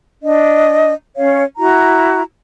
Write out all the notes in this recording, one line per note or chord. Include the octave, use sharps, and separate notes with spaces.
D4 D#5
C#4 C#5 F5
E4 F#4 A#5